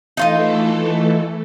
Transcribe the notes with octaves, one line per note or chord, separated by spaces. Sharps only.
E3 A3 D#4 F4 A4 D#5